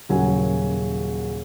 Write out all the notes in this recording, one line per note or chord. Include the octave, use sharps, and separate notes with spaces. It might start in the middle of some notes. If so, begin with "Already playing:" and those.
D#1 C#3 F#3 F#4 A#4 G#5